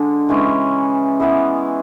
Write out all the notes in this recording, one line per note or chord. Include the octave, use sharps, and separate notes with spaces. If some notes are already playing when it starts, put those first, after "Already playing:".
Already playing: D3 G#3 D4
C#3 E3 G#3 C#4
E3 B3 E4 G#4